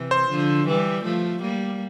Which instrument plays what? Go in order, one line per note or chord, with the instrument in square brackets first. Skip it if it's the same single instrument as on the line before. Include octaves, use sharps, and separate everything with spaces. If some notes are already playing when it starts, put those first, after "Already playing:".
Already playing: [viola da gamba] C3 E3
[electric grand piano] C5
[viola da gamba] D3 F3
E3 G3
F3 A3
G3 A#3